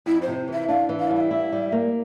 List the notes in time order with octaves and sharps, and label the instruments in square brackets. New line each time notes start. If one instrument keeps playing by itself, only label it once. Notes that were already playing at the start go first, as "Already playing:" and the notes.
[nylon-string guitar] F2 [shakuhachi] E4
[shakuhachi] C5
[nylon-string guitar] C3
E3
[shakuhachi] E5
[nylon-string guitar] D4 [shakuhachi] F5
[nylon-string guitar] E3
[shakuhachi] F5
[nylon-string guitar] G3 [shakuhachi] F5
[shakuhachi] E5
[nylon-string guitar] E4
G3
A#3